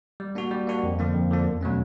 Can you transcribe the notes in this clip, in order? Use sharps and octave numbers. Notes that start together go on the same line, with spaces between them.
G3
A#3 D4 F#4
G3
A#3 D4 F#4
F2
D3 F3 A#3 D4
F2
D3 F3 A#3 D4
E2
B2 F#3 A3 C#4